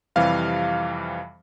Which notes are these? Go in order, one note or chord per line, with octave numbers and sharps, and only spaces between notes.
F2 C3 E3 G3 F5